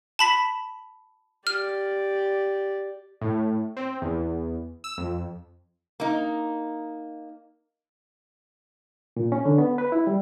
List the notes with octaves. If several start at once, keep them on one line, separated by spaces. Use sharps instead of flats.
A5 B5 B6
G4 D5 F6
A2
C4
E2
E6
F2
A#3 D#4
A#2
C#4
D3
B3
B4
E4
G3